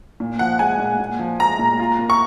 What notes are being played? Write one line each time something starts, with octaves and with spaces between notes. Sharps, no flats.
A#2
F3 F#5
G#3 G#5
A#2
A#2
F3
G#3 A#5
A#2
F4
A#3
C#6